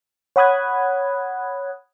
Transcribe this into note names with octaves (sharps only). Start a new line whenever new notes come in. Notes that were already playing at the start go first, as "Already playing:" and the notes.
C#5 F#5 B5 D#6 F#6 G#6